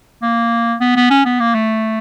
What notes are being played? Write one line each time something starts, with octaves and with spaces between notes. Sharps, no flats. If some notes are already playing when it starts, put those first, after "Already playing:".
A#3
B3
B3
C#4
B3
A#3
A3